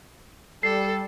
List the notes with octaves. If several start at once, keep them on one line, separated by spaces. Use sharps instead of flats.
G3 A4 C7